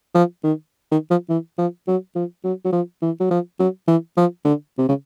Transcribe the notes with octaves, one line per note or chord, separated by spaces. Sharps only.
F3
D#3
D#3
F3
E3
F3
F#3
F3
F#3
F#3
F3
E3
F#3
F3
F#3
E3
F3
D3
C3
C#3